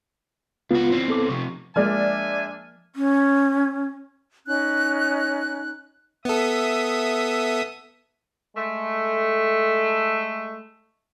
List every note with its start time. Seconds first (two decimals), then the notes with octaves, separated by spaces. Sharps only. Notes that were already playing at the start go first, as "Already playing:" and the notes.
0.71 C#2 B3 F4 F#4
0.90 E3 C4
1.08 B3 A4 D6
1.29 F2 C3 C#6
1.76 F3 G#3 A#3 D4 D5 E5 G#5 F6
2.96 C#4
4.46 C#4 D#4 F#6
6.25 B3 A4 E5 D#6
8.57 G#3 A3